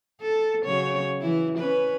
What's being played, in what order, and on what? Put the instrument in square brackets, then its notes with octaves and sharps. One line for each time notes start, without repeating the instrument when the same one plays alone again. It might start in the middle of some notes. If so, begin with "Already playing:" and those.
[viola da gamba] A4
C#3 F#3 C#5
E3 E4
C#4 B4